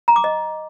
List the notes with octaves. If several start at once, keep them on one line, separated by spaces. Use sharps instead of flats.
A#5
D6
D#5